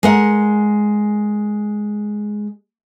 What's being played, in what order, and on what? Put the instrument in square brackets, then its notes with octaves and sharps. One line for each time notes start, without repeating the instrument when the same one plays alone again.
[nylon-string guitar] G#3 A#4 F#5